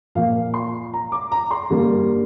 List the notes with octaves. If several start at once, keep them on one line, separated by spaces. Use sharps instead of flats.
A#2 F3 A#3 F5
C6
A#5
D6
A#5
C6
G2 D3 G3 A#3